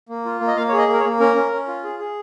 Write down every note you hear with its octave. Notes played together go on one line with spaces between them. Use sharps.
A#3
F4
A#3
D#5
A#3 F5
C#5
G#4 D#5
A#3
A#4
C#5
A#3
C#4 A#4
C#4
C#4
F4
G#4
G#4